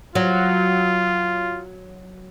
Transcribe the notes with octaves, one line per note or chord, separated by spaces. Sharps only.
F#3 F4